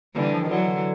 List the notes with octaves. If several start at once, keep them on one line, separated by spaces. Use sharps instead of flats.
D3 E3 G3
F3
D#3
D3 E3 F#3